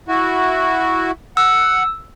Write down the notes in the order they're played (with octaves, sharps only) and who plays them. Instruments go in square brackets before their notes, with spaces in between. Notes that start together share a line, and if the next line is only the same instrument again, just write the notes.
[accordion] E4 F#4
[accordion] F#5 [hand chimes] E6